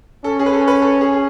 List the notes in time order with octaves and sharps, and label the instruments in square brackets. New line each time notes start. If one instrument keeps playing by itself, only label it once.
[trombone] C#4 [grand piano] A4
[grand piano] G#4
B4
A4
B4
A4
G#4
G#4